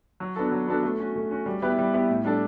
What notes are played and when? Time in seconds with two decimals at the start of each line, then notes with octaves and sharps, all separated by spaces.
0.20 F#3
0.36 B3 D4 F#4 A4
0.52 F#3
0.68 B3 D4 F#4 A4
0.83 A3
0.99 C#4 F#4
1.16 A3
1.31 C#4 F#4
1.46 G3
1.62 B3 E4 G4 B4
1.79 G3
1.94 B3 E4 G4 B4
2.09 A2
2.24 G3 D4 A4